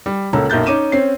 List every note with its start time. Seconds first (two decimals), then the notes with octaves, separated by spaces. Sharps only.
0.06 G3
0.33 C#2 A#3 C#4 A4 A#5
0.50 B1 F#2 A#3 G6 A6
0.66 C#4 D#4 D6 D#7 E7
0.92 C4 C#4 C7